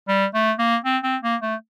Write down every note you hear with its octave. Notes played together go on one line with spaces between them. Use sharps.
G3
A3
A#3
C4
C4
A#3
A3